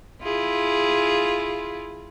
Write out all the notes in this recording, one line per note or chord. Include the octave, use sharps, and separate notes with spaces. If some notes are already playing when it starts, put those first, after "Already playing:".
E4 F4 G#4